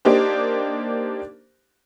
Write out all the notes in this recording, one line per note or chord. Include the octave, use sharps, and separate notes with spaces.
A#3 D4 D#4 G4 C5